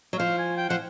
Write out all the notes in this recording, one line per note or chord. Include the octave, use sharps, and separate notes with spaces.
F#3
F3 F5
G#5
G5
F3 F#5